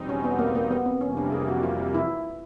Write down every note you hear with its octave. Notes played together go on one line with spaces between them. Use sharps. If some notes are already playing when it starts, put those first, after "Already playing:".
Already playing: E2 B2 G3 C4 D#4
C#4
B3
A#3
A#3
B3
C4
F2 C3 E3 G3 A#3 C#4
D4
G#4
F#4
F4
E4